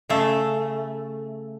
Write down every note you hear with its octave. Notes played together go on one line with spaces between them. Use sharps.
C#3 A3